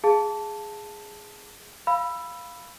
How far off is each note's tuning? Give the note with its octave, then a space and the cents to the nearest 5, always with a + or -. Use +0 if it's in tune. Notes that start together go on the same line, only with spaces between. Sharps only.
G#4 +0 F5 +0 A5 +0
F5 +0 B5 +0 E6 +20